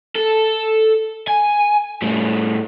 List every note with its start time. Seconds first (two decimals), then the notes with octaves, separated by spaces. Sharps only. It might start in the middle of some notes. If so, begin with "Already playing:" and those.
0.15 A4
1.27 G#5
2.02 A2 G3